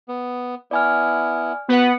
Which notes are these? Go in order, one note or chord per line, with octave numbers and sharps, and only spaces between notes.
B3
B3 E4 D5 G#5 F6
B3 F#4 B4 F#5